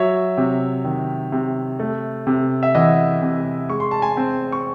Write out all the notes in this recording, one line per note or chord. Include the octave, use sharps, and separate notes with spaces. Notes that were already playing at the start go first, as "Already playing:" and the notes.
Already playing: F#3 C#5 E5
C3
D#3
C3
A3
C3
E5
E3 D#5 F#5
C3
G#3 C#6
C6
A5
G#5 C6
C4
C#6